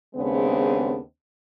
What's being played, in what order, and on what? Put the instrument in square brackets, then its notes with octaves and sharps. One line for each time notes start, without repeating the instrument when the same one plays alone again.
[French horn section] D#2 C#3 G#3 B3 C4 D4